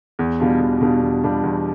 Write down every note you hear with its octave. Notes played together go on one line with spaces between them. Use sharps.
E2
B2 G3 D4 F4
E2
B2 G3 D4 F4
E2
B2 G3 D4 F4
E2